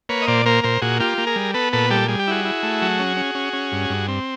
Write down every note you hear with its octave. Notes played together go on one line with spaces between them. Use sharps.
A#3 B4 C#5
D#5
A#2 C5 D5
A#3 A#4 C5
A#2 A#4 C5
A#2 F#4 G#4
A#3 F4 G4
A#3
G#4 A#4
G3
B3 A4 B4
A#2 A4 B4
G3 G4 A4
G3 G#4
G4
E4 F#4 G#4
E4
A3
F#3
C#4
C#4
C#4
C#4
G2
G2
C4